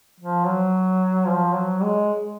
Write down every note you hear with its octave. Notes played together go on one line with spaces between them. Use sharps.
F3
F#3
F3
F#3
G#3